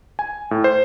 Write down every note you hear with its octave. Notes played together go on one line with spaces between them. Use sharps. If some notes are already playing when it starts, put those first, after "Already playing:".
G#5
A2
C5